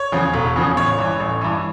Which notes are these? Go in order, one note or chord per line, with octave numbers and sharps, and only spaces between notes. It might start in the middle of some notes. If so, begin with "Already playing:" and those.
Already playing: C#5
E2 C#3 F3
E1
E2 C#3 F3
A1 C#5
G2 E3
A1
G2 E3